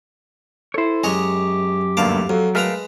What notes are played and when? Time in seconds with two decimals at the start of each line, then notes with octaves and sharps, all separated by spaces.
0.74 E4 A4 C5 C#5
1.04 F#2 G#3 G4 C#5 D#5 G#5
1.97 D2 G2 A#3 F5 A5 D6
2.29 F2 F#3
2.55 G#3 A3 A#4 B4 F5 A#5